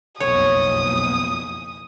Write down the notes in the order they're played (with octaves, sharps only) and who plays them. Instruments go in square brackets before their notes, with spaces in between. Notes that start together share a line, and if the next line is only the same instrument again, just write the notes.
[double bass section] F#1 B1 F2 [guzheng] C#5 [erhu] D#6